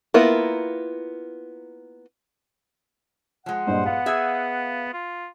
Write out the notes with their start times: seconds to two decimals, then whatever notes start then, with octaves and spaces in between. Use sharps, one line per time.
0.14 A#3 B3 E4 F4 A#4
3.46 F3 G#3 F#5
3.67 G2 A#2 C5 D#5
3.86 B3 F5
4.06 G#4 E5
4.93 F4